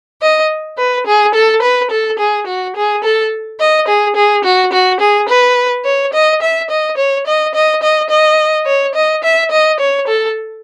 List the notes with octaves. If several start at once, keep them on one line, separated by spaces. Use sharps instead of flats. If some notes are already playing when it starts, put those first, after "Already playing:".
D#5
B4
G#4
A4
B4
A4
G#4
F#4
G#4
A4
D#5
G#4
G#4
F#4
F#4
G#4
B4
C#5
D#5
E5
D#5
C#5
D#5
D#5
D#5
D#5
C#5
D#5
E5
D#5
C#5
A4